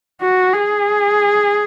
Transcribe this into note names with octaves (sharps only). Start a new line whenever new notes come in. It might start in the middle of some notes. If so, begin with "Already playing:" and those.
F#4
G#4